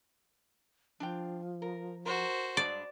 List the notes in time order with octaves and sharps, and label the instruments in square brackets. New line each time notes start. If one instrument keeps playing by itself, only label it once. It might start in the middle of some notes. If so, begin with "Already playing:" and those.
[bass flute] F3 [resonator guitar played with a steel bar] D4 F4 G5
[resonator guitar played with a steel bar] A#4
[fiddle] F#4 C5 [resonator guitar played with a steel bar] A#4
[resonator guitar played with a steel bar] G2 G#3 D4 [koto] D5